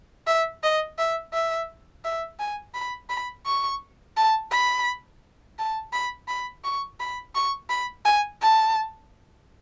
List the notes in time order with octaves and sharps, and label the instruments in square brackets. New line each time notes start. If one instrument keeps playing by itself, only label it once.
[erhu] E5
D#5
E5
E5
E5
G#5
B5
B5
C#6
A5
B5
A5
B5
B5
C#6
B5
C#6
B5
G#5
A5